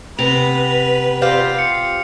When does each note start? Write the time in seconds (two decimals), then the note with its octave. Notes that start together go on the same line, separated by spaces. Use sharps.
0.19 C3 B3 B4 F7
1.22 C4 F4 G4
1.59 C7 C#7